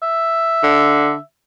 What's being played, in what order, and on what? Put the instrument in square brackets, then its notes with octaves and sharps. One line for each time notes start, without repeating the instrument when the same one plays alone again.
[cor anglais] E5
[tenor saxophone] D3